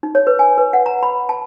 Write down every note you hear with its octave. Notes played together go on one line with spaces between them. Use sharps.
D#4
C#5
B4
G#5
B4
F#5
A#5
B5
A5